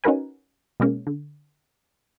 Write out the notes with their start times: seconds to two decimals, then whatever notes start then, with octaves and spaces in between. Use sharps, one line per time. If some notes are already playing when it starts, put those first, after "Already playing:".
0.04 C#4 D#4 F#4 A#4 B4 G#5
0.80 B2 G#3 A#3 C#4
1.07 D3